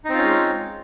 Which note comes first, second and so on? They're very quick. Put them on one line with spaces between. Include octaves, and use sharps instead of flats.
D#4 C4 F4 C#4 G#3